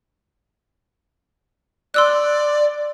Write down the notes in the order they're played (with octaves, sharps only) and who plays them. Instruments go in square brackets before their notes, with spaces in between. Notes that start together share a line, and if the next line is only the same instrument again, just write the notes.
[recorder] D5 [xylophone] C6 E6 F#6